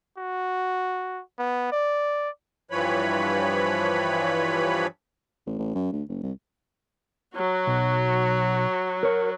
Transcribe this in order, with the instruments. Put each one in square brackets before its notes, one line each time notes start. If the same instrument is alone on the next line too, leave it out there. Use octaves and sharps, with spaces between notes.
[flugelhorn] F#4
B3
D5
[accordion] G2 E3 F3 B4 C#5 B5
[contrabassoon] A1
A1
F#2
D2
F#1
C2
[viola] F#3 F#4
[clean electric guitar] B1
A#4 C#5